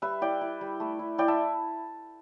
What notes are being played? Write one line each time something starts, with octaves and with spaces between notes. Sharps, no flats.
G3 B4 E5
E4 D5 G5
E4
G3
A3
E4
E4 D5 G5
E5 A5